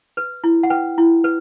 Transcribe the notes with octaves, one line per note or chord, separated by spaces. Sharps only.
B4
E4
F#5
B4 G5
E4
B4